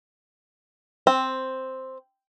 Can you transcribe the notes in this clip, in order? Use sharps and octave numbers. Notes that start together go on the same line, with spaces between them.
C4